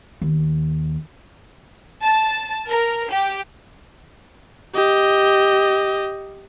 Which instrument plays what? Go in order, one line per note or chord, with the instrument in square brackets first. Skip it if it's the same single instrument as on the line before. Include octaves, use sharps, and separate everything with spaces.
[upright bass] D#2
[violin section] A5
A#4
G4
[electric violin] G4 D#5